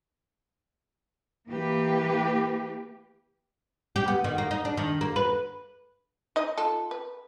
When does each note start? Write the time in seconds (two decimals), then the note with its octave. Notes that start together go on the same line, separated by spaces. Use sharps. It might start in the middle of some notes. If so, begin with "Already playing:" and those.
1.48 E3 A#3 G4 B4
3.96 G4
4.08 B3
4.24 D#3
4.38 A#3
4.51 D#4
4.65 D4
4.77 D#3
5.01 A#3
5.16 B4
6.36 D#4 D#5
6.58 F4 A4
6.91 B4